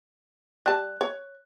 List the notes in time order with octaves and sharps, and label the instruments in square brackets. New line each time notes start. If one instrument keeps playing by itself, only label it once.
[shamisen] G3 A5 [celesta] F#6
[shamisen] C#5